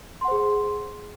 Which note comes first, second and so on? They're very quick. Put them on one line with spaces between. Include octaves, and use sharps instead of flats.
C6 F#5 C5 G#4